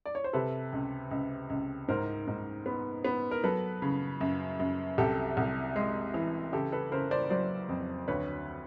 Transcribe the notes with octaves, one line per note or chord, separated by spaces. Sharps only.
D5
C#5
C5
C3 A4 B4
C#2
C#2
C#2
G#2 A#4 C5
G#2
B3
B3
A#4
F#3 A4 B4
C#3
F#2
F#2
C2 G4 A4
C2
G#3
E3
C#3 G4 A4
A4 B4
C#3 A#4 C5
C5 D5
F#3 C5 D5
F2
D2 B4 C#5